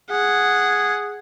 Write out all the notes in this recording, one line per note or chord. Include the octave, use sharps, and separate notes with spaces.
G#4 F#5